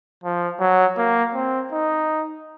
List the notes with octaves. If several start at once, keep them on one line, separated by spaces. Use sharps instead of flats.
F3
F#3
A#3
C4
D#4